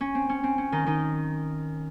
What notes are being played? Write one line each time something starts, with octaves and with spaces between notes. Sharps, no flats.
C#4
C4
C#4
C4
C#4
D#3 D#4
D#3 D#4